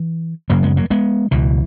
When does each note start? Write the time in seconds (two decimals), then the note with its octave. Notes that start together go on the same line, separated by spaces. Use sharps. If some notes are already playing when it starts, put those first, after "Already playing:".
Already playing: E3
0.50 F#1 F#2 C#3 F#3 A#3
0.63 G#3 B3
0.77 F#3 A#3
0.90 G#3 B3
1.31 C#2 B2 E3